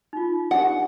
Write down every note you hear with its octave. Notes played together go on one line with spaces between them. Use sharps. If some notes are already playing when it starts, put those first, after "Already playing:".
D#4 F4
D4 D#4 G4 F#5